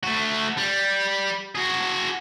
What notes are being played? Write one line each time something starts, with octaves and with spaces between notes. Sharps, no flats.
A3 F#4
G3
F#4 G#4